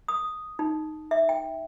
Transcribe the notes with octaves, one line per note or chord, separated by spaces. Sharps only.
D#6
D#4
E5
G5